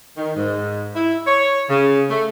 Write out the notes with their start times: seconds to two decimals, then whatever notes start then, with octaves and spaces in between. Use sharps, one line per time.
0.17 D#3
0.36 G#2
0.96 E4
1.27 C#5
1.69 C#3
2.11 A3